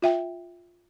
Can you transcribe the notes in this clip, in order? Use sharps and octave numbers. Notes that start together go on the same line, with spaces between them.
F4 E5 G5